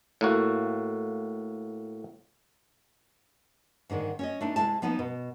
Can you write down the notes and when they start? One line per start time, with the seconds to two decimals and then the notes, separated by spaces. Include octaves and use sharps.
0.21 A2 A#3 F#4
3.90 G#2 D3 D#3 G#3
4.19 C#4 C#5 D#5
4.41 A3 D4 D#4
4.56 C3 G#3 E4 A5
4.82 F3 B3 D#4 C5
4.99 B2